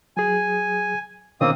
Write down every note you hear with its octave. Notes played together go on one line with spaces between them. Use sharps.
F#3 G#4 G#5
B2 D#3 A#3 C4 C#4 D#6